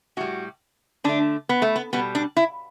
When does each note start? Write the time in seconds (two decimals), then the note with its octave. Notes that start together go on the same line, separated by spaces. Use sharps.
0.17 A2 G3 F#4
1.04 D3 A3 D4
1.49 B3
1.62 A3
1.76 B3
1.93 B2 G3 B3
2.15 D4
2.37 E4